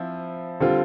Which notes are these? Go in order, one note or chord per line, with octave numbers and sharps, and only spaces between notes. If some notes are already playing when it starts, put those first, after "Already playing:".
Already playing: F3 C4 E4
D3 G3 C4 F4